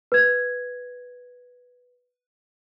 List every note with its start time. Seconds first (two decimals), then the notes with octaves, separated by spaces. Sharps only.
0.12 B4 G#6